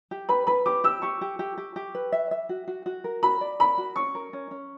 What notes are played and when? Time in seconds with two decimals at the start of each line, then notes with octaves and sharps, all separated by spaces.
0.11 G4
0.29 B4 B5
0.47 B4 B5
0.66 G4 D6
0.84 G4 E6
1.02 G4 C#6
1.21 G4
1.39 G4
1.58 G4
1.76 G4
1.95 B4
2.12 E5
2.31 E5
2.49 F#4
2.68 F#4
2.86 F#4
3.04 A#4
3.23 F#4 B5
3.41 D5
3.60 A#4 B5
3.78 F#4
3.96 C#4 C#6
4.15 A#4
4.33 C#4
4.51 C#4